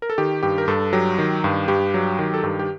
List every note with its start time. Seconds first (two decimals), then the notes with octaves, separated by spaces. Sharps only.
0.02 A#4
0.10 A4
0.18 D#3 G4
0.43 G2 G4
0.58 A#4
0.68 G2 A4
0.93 F#3 G4
1.18 D#3
1.44 G2
1.68 G2 G4
1.94 F#3
2.19 D#3
2.34 A4
2.44 G2 G4
2.59 G4